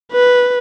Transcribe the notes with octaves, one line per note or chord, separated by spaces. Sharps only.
B4